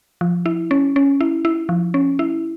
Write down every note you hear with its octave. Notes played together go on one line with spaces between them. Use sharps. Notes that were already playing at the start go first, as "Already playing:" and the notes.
F3
E4
C#4
C#4
E4
E4
F3
C#4
E4